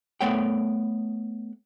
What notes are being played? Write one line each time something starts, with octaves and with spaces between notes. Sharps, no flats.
A3 B3 C#5 F#5 G5